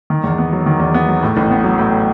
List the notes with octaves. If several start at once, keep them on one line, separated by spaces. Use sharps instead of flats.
D#3
E2
B3
F#3
D#3
E2
B3
F#3
A2
A1
B3
F#3
A2